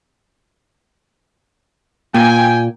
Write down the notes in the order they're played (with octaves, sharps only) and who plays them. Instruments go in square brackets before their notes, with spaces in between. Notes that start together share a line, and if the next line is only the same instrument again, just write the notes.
[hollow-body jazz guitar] A#2 [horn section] G5 G#5